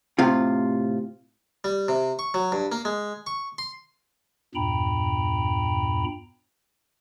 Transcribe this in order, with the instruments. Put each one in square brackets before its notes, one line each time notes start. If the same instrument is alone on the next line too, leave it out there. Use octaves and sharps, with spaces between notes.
[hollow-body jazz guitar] A2 C3 F4
[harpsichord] G3
C3
C#6
F#3
G2
A#3
G#3
C#6
C6
[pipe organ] E2 G2 A#2 G5 A#5 B5